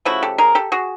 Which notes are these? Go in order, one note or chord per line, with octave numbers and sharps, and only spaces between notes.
C#3 F3 A3 E4 F#4
G4 A4
G#4 A#4
G4 A4
F#4 G#4